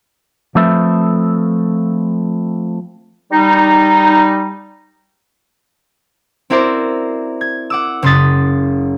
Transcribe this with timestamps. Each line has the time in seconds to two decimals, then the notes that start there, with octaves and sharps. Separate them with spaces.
0.55 F3 A3 C4 A4 B4 E5
3.31 G3 D#4
6.50 C4 E4 F#4 A#4 C5 D5
7.41 G#6
7.70 F#5 D6 E6
8.02 F#1 C#3 C6 D#6 A6 B6